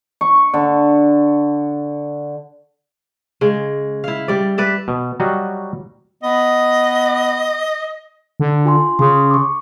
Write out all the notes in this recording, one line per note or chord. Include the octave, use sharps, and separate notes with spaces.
C#6
D3
C#3 G#3
E4 F5
G3 D5
B4 D5 E5
B2
F#3 G3 F#4 D#5 F5
B3 D#5
D3
F4 G#5 C6
C#3 C6 D#6
C#6 D6